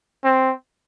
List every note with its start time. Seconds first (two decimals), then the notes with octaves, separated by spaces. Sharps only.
0.24 C4